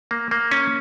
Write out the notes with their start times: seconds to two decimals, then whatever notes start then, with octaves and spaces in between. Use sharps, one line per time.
0.11 A#3
0.31 A#3
0.51 C#4